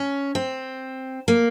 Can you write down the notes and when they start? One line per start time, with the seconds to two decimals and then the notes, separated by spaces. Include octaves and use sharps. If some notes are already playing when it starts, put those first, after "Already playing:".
Already playing: C#4
0.35 C4
1.28 A#3